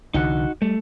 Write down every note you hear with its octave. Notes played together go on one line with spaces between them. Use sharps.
C2 D3 E3 D#4 F#4 F#5
G3 A3